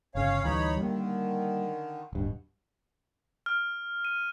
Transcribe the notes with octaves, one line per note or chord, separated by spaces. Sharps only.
G1 C#3 C#4 C#5 F5
D2 E3 G3 D#4 C#5 B5
D3 D#3 G3 A#3
D1 G2 B2
F6
D#7